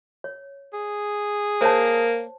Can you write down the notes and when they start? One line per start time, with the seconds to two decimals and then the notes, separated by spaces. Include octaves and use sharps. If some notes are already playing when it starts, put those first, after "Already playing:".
0.24 C#5
0.73 G#4
1.61 A#3 C5 C#5 A5